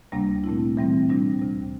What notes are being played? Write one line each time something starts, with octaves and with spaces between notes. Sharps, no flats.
D2 C3 G3 A#3 D4
A#2 A3 C4 E4
A2 E3 G3 C4
C3 G3 D4 F4
D2 C3 G3